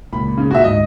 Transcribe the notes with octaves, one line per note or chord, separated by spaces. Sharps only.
C#2 A#2 B5
C#3
A#2 F#4 E5
D2 G#2 D#5